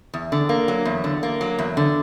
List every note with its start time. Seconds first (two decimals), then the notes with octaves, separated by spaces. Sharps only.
0.14 E2
0.32 D3
0.49 A#3
0.68 F#3
0.85 E2
1.04 D3
1.23 A#3
1.41 F#3
1.59 E2
1.77 D3